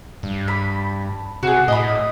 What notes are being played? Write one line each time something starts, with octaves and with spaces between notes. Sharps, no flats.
G2
B5
C3 F#4 G#4
A2 D#5 B5